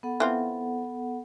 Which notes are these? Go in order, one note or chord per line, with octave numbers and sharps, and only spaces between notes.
B3 A4 F#5
E3 C4 F4